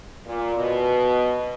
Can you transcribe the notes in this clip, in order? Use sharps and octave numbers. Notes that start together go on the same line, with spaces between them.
A#2
B2